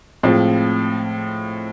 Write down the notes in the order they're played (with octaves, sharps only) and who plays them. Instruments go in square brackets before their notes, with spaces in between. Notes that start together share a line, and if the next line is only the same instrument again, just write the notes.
[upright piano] A2 F3 G#3 C4 F4